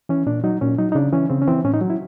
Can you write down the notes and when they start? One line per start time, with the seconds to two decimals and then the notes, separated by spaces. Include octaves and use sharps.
0.09 E3 C#4
0.26 A#2 D4
0.44 F#3 D#4
0.61 A#2 C#4
0.78 F#3 D#4
0.92 D#4
0.95 C#3 D4
1.13 E3 C#4
1.30 C#3 C4
1.42 C#4
1.47 E3 C4
1.64 A2 C#4
1.74 D#4
1.81 F#3
1.90 E4